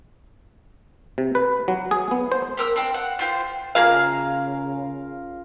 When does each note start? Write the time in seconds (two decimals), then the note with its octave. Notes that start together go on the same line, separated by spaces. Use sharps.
1.18 C3
1.35 B4
1.68 F#3
1.91 G#4
2.11 B3
2.32 C5
2.57 G4 A#4 E6
2.76 C4 D4 G5
2.94 F#5
3.19 F4 G4 C5
3.75 C#3 A#3 F4 G#4 A#4 F5